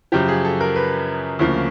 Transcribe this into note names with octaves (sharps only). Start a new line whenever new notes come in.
F#2 C#3 F3 G4
G#4
A4
A#4
B4
D2 C#3 F3 A#3